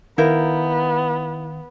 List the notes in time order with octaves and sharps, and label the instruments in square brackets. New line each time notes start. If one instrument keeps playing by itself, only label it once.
[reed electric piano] D#3 F5 G6 [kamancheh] B3 [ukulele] E4 A#4